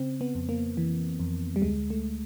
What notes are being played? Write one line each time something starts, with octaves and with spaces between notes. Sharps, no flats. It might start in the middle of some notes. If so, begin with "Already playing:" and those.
Already playing: C#3 C4
B3
F2
A#3
E3
F2
G3
D2 G#3
A3